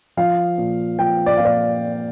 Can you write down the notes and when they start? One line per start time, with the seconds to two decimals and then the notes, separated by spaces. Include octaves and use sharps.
0.17 F3 F5
0.58 A#2
0.99 F3 G5
1.26 D5
1.37 A#2 F5
1.45 D5